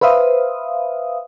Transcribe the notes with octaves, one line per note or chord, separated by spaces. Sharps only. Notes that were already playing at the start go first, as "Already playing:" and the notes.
B4 C5 E5 F5 D#6